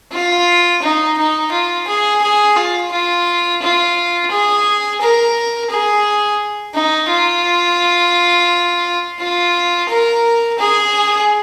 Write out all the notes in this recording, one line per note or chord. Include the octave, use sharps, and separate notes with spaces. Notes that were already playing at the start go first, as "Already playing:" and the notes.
F4
D#4
D#4
F4
G#4
G#4
F4
F4
F4
G#4
A#4
G#4
D#4
F4
F4
A#4
G#4